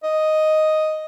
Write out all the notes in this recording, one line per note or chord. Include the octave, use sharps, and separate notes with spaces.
D#5